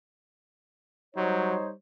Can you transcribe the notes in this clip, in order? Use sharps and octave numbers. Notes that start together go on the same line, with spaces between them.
F#3 G3 D#4 C5 C#5